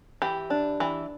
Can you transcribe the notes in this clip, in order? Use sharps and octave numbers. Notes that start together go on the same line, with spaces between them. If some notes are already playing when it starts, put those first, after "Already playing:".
E3 G4
D4
E3